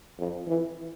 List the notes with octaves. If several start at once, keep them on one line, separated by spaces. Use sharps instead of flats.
F2
E3